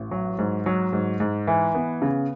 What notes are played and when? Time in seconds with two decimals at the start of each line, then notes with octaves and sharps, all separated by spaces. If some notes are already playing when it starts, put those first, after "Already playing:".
Already playing: A1
0.11 F#3
0.39 G#2
0.66 F#3
0.93 G#2
1.20 G#2
1.47 E3
1.75 B3
2.02 C#3